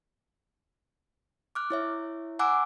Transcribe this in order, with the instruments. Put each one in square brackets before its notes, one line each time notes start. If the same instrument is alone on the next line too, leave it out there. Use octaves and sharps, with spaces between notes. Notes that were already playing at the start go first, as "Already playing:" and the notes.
[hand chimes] D6 F6 F#6
E4 C#5 E5
F#5 G#5 A#5 D6 E6 F#6